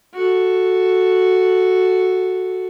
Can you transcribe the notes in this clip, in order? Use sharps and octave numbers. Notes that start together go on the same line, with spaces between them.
F#4 A4